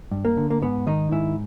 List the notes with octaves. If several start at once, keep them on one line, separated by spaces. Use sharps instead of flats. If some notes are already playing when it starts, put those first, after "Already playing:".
G2
A#3
D3
A#3
G#2 B3
D#3 D#4
G#2 E4